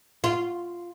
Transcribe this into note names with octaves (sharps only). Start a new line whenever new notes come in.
F4